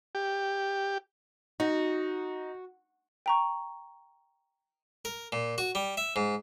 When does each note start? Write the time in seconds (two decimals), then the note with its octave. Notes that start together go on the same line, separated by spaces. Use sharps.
0.15 G4
1.60 D#4 F#4
3.26 G5 A#5 C#6
5.05 A#4
5.32 A#2
5.58 F#4
5.75 G3
5.97 E5
6.16 G#2